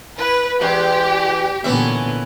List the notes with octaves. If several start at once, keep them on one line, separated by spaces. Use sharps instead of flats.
E4 B4
E2 G#3 G4
A#2 D3 E3 B3 C#4 E5